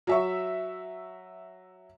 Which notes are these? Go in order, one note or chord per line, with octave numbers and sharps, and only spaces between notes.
F#3 E5 C#6